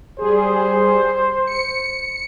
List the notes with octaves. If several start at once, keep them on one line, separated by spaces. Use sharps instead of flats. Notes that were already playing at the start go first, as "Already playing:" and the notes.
G3 G#4 C5
C#7